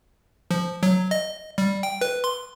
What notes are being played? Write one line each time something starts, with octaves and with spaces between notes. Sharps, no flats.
F3
F#3
D#5
G3
G5
B4
C6